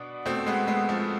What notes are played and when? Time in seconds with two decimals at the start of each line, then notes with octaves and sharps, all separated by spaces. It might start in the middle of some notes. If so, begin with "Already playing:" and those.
Already playing: B2 B3 D4
0.26 B2 A3 C4
0.46 G#3 B3
0.67 G#3 B3
0.89 F3 A3